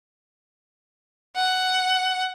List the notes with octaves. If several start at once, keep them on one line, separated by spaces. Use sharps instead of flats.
F#5